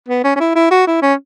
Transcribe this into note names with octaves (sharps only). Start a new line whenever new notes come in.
B3
C#4
C#4
E4
E4
F#4
E4
C#4